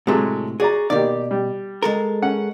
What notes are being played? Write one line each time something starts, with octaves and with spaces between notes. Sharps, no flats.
A2 C3 F#3 G#3 A3
F#4 G#4 D5 A#5
B2 D#3 A#3 G4 D5
G3
G#3 A4 A#4
C#4 F#5